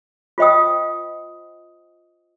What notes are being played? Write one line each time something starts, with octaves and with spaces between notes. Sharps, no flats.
F4 C5 D#5 G5 D#6